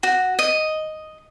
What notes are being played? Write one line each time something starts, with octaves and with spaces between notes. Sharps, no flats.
F#4
D#5